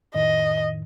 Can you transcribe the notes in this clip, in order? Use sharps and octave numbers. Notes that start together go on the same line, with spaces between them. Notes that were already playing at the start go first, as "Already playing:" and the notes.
F2 A2 D#3 D#5